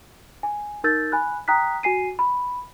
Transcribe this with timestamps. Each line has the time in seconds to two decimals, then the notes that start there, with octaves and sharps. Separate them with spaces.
0.43 G#5
0.84 D#4 A#4 E6 G6 A6
1.12 G#5 B5 F#6
1.48 G5 A#5 D#6 F#6 B6
1.83 F#4 G#5 C7 D#7
2.19 B5